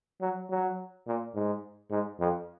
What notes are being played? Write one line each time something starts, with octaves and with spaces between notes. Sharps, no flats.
F#3
F#3
A#2
G#2
G#2
F2